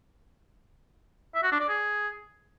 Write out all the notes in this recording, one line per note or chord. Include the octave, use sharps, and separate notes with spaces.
E5
F#4
D4
D5
G#4